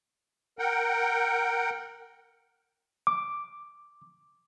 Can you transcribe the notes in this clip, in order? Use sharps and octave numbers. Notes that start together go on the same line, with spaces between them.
A#4 F#5 G5
D6